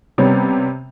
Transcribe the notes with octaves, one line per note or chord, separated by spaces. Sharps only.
C3 G3 B3 C#4